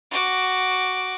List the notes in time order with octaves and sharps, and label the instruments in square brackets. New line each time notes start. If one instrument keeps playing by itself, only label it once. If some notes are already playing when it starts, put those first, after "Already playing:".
[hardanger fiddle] F#4 D6